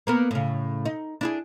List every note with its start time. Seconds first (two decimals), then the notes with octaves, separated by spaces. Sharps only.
0.07 A#3 B3 A#4
0.31 A2 C#3
0.85 D#4
1.21 D4 E4 G#4